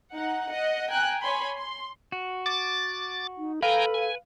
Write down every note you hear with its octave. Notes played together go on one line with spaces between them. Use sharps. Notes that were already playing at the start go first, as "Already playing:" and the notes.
D#4 F#5
D#5 F#5
G5 G#5 A#5 F#6
C#5 G#5 B5 C6
C6
F#4
D6 A6
D#4
A4 B4 F5 G5 G#5 A#5
G#5